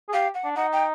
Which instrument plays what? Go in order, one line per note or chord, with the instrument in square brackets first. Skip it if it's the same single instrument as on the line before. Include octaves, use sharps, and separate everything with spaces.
[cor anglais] G#4
[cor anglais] G4 [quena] F5
[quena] F#5
[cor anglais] D4
[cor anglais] D#4 [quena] F#5
[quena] G5